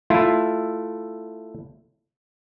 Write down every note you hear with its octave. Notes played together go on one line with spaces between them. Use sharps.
A3 E4 F4